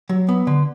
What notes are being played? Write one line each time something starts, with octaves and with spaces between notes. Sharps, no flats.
F#3
B3
D3